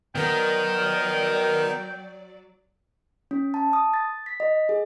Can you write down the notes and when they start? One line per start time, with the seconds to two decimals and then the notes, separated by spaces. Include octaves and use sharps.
0.15 D#3 F#3 B3 A#4 D5 G5
3.31 C#4
3.54 A5
3.73 D#6
3.94 A6
4.26 B6
4.40 D#5
4.69 G#4